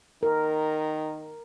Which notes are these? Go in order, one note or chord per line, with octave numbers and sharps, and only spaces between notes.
D#3 A#4